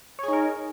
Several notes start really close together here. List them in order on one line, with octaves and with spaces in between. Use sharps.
C#5 G#4 D#4 A#4